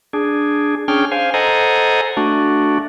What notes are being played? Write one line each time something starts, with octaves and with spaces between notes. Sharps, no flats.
D4 G#4
C#4 D4 G#4 G5 F6
C5 F5 G#5
A4 C5 D#5 F#5 G#5 A#5
A3 D4 F#4